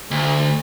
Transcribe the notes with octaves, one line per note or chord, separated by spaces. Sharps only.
D2